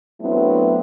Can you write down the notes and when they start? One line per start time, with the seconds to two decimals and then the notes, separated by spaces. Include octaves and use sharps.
0.21 F#3 A3 B3 C4 D4 E4